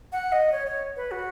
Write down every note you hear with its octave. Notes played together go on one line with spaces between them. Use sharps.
F#5
D#5
C#5
C#5
B4
F#4